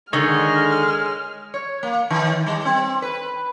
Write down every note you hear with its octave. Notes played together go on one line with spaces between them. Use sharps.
D3 D#3 G#3 C#5 D#5 F6
C#5
A#3
D#3
G3
C4
B4